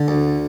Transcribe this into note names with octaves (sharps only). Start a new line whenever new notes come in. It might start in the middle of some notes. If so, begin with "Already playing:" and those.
Already playing: D3 A4
D2